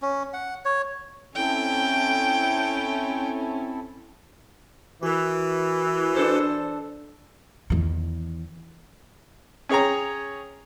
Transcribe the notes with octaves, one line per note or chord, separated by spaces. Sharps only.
C#4
F#5
C#5
C4 C#4 E4 A4 G5
E3 F#4 A#4
D4 A4 C5
E2 D#3
C#4 G#4 C#5 G5 A#5